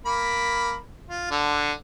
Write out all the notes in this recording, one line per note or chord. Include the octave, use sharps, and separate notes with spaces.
A#3 B5
F4
D3